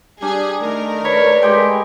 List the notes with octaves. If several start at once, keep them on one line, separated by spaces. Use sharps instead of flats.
G3 D4 G#4
D#3 A3 A#4
B4 C#5 D5 B5
G#3 G4 G5